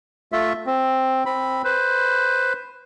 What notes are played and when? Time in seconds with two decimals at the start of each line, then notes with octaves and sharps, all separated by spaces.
0.32 A3 F4 E5
0.66 C4
1.26 C4 B5
1.64 B4 C5